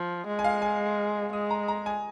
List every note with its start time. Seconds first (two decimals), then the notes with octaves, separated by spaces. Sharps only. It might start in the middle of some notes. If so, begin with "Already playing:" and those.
Already playing: F3
0.27 G#3
0.39 G#5
0.44 F5
0.62 G#5
1.32 G#3 D#6
1.50 A#5
1.68 A#5
1.86 G#5